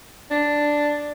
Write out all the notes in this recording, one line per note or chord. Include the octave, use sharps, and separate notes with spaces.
D4